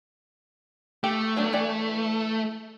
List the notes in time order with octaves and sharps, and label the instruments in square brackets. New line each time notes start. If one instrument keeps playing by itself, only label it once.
[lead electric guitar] A3 [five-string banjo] G4
[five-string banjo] F#3 B3 D4
E3 D5 G5